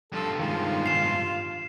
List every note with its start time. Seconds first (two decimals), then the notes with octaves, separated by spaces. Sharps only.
0.13 G2 F3 A4
0.39 D#3 G#3 F4
0.86 F5 C7 E7